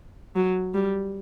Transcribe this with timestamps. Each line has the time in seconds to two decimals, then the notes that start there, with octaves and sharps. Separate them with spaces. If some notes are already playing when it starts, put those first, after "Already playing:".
0.36 F#3
0.74 G3